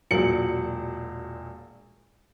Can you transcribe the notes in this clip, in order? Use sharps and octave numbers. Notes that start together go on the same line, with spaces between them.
E1 A#2 F#3 C#7 F#7